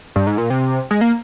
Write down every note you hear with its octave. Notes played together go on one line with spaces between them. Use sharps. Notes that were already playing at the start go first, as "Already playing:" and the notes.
G2
G#2
A#2
C3
G#3
A#3